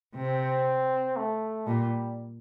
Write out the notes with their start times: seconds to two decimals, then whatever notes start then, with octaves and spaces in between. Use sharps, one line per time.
0.15 C3 C4
1.17 A3
1.67 A#2 G3